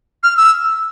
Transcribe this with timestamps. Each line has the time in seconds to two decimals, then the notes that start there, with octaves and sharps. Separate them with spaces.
0.23 F6
0.37 E6